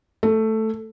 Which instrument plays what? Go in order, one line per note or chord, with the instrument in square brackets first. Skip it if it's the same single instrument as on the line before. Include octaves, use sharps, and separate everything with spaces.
[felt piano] A3